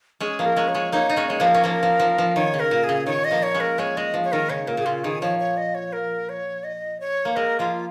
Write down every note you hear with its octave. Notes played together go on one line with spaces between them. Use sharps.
G#3 C#4 G#4
F3 A#3
A#4
G#3 C#4
C#5
G#3 C#4
A#3 D#4 C#5
D#4 D#5
G#3 C#4
G#3 C#5
F3 A#3
A#4
C#4
F3 A#3
F3
F3
F3
D#3 C#5
C#3
A#4
A#2
G#4
C#3
D#3 C#5
D#5
F3 A#3
C#5
G#3 C#4
A#4
G#3 C#4 C#5
G#3 D#5
F3
C#5
D#3 A#4
C#3 C#5
A#2 A#4
A#2 G#4
C#3 F4
D#3 G#4
F3 C#5
C#5
D#5
C#5
A#4
C#5
D#5
C#5
A#3
G#3 A#4
F3 A#3 F4